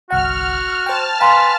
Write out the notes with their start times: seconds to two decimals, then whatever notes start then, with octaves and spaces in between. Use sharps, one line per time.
0.11 G1 C2 F#4 F#5 F6
0.86 C5 G5 A5 F6
1.20 B4 F5 G5 G#5 A#5 C6